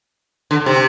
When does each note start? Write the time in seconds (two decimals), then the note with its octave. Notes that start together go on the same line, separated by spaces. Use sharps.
0.51 D3
0.66 C3